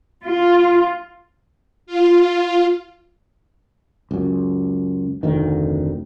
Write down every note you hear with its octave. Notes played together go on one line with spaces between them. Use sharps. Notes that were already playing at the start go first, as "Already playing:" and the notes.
F4
F4
C#2 F#2
F1 D2 D#3